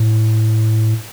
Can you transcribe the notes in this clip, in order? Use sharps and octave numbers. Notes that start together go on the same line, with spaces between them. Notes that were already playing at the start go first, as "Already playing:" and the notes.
Already playing: A2